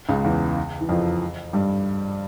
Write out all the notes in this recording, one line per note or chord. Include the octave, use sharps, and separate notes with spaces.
C#2 C#3
E2 E3
E3
F2 F3
G2 G3